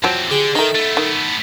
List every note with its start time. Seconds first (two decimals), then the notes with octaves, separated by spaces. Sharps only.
0.04 E2 F3 F#3 C4
0.31 D3 G4 G#4
0.55 D#3 D#4 A4 A#4 E5 G5
0.75 A3 B3
0.97 D#3